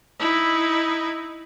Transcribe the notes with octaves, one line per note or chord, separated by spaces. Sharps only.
D#4 E4